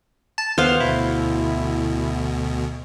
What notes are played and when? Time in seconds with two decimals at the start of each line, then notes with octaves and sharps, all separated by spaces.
0.38 A5
0.58 D#2 B3 C5 F5
0.80 D2 B2 E4